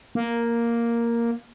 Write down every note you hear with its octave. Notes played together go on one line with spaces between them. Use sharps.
A#3